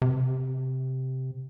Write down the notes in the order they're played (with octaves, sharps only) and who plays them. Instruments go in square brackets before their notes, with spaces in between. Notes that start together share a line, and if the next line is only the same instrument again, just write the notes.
[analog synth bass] C3